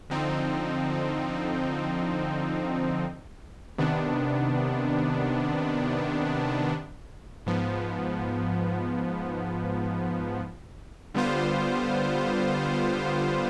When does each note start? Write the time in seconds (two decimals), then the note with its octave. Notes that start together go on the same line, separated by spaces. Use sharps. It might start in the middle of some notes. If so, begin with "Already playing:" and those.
0.10 D3 F3 C4 D#4
3.78 C3 D#3 B3 D4
7.46 G#2 F3 B3
11.14 D3 G3 B3 F4 C5